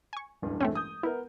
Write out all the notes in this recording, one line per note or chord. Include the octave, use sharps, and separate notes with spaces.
G#5 C#6
E1 A1 G2
A3 C4 C#4
D#6 G6
B3 E4 A#4